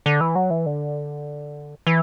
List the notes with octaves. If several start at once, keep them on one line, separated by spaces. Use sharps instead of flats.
D3
E3
F#3
E3
D3
E3